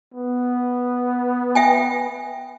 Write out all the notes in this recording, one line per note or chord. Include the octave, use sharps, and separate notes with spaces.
B3
E5 G5 G#5